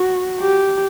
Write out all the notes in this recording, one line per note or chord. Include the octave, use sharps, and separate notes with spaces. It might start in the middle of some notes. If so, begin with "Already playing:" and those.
Already playing: F#4
G4